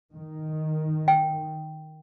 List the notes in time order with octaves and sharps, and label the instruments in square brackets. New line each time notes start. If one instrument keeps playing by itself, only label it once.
[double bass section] D#3
[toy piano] G5